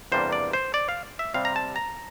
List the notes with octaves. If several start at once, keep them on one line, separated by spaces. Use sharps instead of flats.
E2 C3 G3 A#3 D4 C5
D5
C5
D5
F5
E5
C3 G3 C4 F5
A#5
A5
A#5